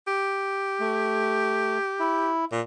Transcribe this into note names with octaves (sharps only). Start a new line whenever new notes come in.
G4
A3
E4
A#2